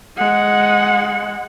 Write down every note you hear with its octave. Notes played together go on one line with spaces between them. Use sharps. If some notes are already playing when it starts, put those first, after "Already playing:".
G#3 F#5